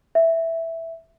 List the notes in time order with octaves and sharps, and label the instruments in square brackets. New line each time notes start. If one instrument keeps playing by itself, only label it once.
[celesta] E5